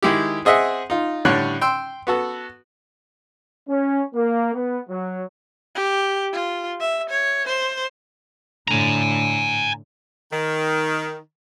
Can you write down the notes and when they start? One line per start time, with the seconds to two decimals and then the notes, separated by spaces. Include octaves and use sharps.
0.03 D#3 G#3 E4 G4
0.45 C4 G#4 D#5 E5 F#5
0.90 D#4 F4
1.25 A2 D3 G3 C#5 F#6
1.61 G5 C6 E6
2.07 B3 F#4 A4
3.68 C#4
4.14 A#3
4.54 B3
4.89 F#3
5.75 G4
6.33 F4
6.80 E5
7.09 C#5
7.47 C5
8.68 A2 D3 G#5 A#5
10.32 D#3